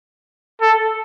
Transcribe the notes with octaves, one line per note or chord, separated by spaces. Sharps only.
A4